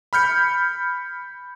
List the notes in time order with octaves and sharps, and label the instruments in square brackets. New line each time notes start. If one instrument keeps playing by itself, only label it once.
[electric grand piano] B5 F6 G6 C#7